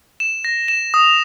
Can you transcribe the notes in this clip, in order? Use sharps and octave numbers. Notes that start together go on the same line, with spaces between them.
E7
A#6
E7
D#6